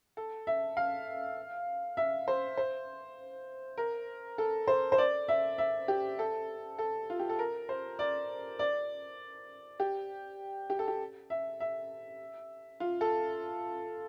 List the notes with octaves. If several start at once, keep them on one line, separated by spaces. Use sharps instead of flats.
A4
E5
F5
E5
C5
C5
A#4
A4
C5
C5
D5
E5
E5
G4
A4
A4
F4
G4
A4
A#4
C5
D5
D5
G4
G4
A4
G4
E5
E5
F4
A4